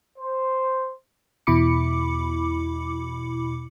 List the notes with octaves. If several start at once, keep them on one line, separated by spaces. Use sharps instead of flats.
C5
E2 B2 E4 B5 D6 C#7